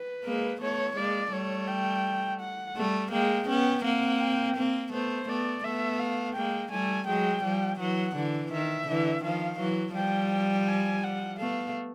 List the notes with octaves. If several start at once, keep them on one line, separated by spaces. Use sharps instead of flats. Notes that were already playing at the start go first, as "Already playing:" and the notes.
Already playing: B4
G#3 A#3
A3 B3 C#5
G#3 A#3 D5
G3 A3 C#5
G5
F#5
G3 A3
G#3 A#3 G5
B3 C#4 G5
A#3 C4 F#5
G5
A#3 C4
A3 B3 C5
A3 B3 D5
A3 B3 E5
F5
G#3 A#3 G5
G3 A3 G#5
F#3 G#3 G5
F3 G3
E3 F#3 F#5
D3 E3
D#3 E5
D3 E3
D#3 F3 F5
E3 F#3
F3 G3 G5
G5
G#5
F#5
A3 B3 F5